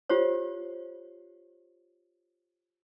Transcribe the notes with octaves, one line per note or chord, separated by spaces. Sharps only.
F4 G4 C5 C#5